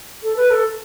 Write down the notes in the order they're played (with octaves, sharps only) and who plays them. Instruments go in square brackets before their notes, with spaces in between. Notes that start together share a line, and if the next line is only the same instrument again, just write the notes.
[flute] A4
B4
A4